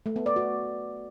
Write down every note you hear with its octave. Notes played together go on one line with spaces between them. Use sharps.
A3
B3
D5
F#4